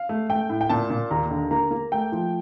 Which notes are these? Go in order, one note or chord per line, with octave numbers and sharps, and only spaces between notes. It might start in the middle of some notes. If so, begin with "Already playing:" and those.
Already playing: F5
A3
A3 G5
A2
G5
A#2 A5
A#2
D#2 A#5
D3
A#3 A#5
A#3
A3 G5
F3